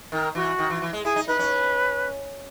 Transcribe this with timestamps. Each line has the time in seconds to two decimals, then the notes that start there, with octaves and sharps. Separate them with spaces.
0.12 D#3 A#4
0.35 E3 F#4
0.59 D#3
0.70 E3
0.82 E3
0.93 G#3
1.04 E4 G#4
1.16 D#4
1.28 D#4 B4
1.39 C#4